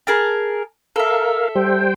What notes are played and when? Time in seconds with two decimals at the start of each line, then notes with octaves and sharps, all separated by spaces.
0.07 G#4 A#4 A5
0.96 A4 A#4 E5 F5
1.55 G3 C5 G5